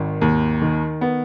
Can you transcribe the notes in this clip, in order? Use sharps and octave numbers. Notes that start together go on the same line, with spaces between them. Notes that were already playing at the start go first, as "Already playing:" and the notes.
Already playing: G#1 D#3
D#2
D#3
B3